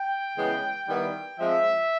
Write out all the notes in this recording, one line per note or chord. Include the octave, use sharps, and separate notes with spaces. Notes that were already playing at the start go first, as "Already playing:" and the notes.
Already playing: G5
C#3 E3 G#3 B3
D#3 G3 B3 E4 G5
F3 G#3 C4 E5